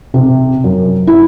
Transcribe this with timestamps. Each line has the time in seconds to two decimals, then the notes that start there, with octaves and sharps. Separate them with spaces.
0.14 C3
0.64 F#2
1.07 E4